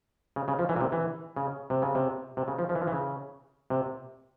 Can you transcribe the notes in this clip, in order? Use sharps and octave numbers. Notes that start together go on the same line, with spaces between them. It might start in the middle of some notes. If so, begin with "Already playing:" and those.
C#3
C#3
F3
E3
A#2
C3
E3
C#3
C3
C#3
C3
C3
C#3
F3
F3
E3
F3
E3
C#3
C3